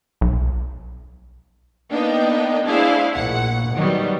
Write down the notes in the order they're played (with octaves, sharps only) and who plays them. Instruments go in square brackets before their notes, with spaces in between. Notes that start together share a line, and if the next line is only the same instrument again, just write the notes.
[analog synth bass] B1
[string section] A#3 B3 D4 D#4 D#5 G5
A3 D4 E4 G#4 C5 F5
A#1 F#5
D#3 F#3 G3 B3